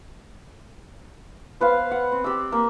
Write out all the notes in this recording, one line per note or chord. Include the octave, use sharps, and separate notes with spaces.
B3 B4 C5 F5
F#5
C4
G4 D5 E6
A#3